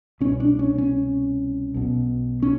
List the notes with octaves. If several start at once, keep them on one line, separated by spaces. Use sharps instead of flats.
C2 B2 C#4
D4
C#4
C#4
B1 B2
C#4